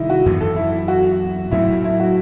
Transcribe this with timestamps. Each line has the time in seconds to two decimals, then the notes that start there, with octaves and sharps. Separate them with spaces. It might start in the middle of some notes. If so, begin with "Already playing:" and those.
Already playing: C3 D#3 G3 D#4 E4
0.10 F#4
0.26 F#2 E3 B3
0.41 A4
0.56 E4
0.88 F#4
1.51 A2 F#3 A3 C4 E4
1.84 E4
2.00 F#4